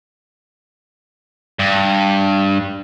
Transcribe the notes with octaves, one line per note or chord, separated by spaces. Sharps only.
G2